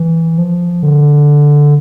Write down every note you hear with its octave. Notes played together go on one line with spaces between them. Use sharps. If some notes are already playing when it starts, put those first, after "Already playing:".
Already playing: E3
F3
D3